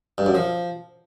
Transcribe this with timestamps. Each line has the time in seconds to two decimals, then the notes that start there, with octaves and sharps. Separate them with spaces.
0.18 G2
0.26 F#2
0.35 F3